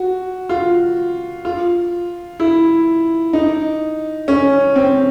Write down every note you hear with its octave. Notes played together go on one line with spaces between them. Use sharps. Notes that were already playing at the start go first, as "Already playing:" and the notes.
Already playing: F#4
F4
F4
E4
D#4
C#4
C4